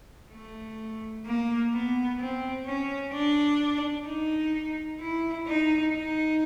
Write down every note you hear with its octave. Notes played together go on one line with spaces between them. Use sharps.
A3
A#3
B3
C4
C#4
D4
D#4
E4
D#4
D#4